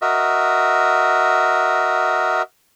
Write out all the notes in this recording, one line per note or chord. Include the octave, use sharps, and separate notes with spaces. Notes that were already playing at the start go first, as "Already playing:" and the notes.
F#4 A#4 D#5 E5